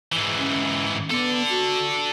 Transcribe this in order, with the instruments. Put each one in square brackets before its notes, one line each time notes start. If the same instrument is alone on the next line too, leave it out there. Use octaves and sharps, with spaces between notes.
[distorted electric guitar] G#2 E3
[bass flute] C#4
[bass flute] B3 [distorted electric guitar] A4 D5
[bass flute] F#4